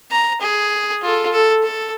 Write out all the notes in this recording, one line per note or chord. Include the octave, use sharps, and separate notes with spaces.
A#5
G#4
F4 A4
A4
A4